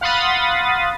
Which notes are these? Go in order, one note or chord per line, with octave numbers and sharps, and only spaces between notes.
F5 F#5 B5 C6 D#6 A6